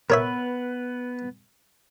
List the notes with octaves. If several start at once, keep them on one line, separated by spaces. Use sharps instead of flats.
B3 A#4 B4 C#5 E5